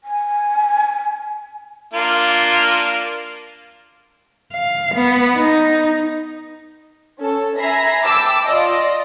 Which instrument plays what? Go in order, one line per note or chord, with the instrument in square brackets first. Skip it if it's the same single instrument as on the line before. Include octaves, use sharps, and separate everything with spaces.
[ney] G#5
[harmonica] A#3 D4 F4
[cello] F5
B3
D#4
[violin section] C#4 A4
E5 G#5 A#5 B5 A#6 C7
G5 A5 B5 D6 E6
F4 D5 D#5